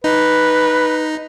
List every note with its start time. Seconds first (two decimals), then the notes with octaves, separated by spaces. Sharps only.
0.04 D#4 B4